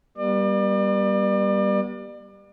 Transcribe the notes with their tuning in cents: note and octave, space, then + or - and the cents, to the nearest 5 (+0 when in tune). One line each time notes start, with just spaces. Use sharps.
G3 +0 B3 -40 D5 +35